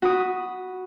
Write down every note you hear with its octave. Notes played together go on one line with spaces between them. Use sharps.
F#4 B5 D#6